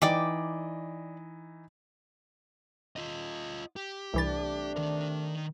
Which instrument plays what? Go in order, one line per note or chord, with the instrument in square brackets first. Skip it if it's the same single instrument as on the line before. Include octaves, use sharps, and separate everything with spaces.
[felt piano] E3 D#4 D#5 [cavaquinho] D5 G5 D6
[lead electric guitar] F4 D#5
G4
[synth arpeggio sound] C2 E3 A6 [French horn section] C3 A3 D4
[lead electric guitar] D#3 A#4